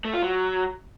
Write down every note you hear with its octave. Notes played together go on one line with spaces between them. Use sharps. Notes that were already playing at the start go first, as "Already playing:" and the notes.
A3
F4
F#3